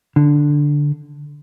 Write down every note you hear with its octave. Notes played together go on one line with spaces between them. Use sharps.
D3